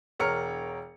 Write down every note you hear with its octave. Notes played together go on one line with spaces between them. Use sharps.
E1 A#4 C#5 F6 C#7